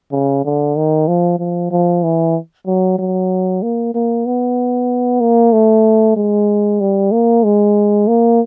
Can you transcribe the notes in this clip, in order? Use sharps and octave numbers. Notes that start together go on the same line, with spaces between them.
C#3
D3
D#3
F3
F3
F3
E3
F#3
F#3
A#3
A#3
B3
A#3
A3
G#3
G3
A#3
G#3
A#3